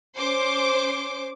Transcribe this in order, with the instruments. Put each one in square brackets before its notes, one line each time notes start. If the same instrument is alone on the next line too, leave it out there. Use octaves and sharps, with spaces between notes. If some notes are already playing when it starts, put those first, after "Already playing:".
[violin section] C#4 C5 D6